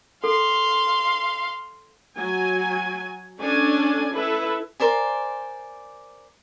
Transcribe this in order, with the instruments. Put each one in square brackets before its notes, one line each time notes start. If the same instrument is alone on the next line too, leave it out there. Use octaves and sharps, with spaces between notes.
[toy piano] A4 [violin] F5 C6
[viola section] F#3 G#5
C#4 D4 A4 D5 G#5
E4 A4 B4 E5
[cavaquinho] A#4 C5 D5 G#5